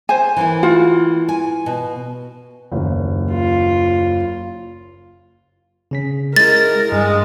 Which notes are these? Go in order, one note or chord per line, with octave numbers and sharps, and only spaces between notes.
C5 G#5
E3 A#3 E4
F4 F#4 F#5
G#5
B2
F#1 D#2
F4
C#3 C#4 B6
G#3 E4 A#4 A6
G2 G#3